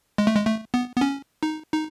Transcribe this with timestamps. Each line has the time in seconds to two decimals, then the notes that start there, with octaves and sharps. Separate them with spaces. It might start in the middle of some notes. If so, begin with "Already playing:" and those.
0.18 G#3
0.27 A3
0.36 G#3
0.47 A3
0.74 B3
0.96 B3
1.01 C#4
1.43 D#4
1.73 D#4